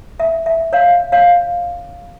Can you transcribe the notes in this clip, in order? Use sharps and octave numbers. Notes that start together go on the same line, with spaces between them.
E5
E5
C#5 F5
C#5 F5